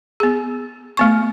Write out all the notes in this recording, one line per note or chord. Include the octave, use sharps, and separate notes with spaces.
B3 G#4
A3 B3 C#6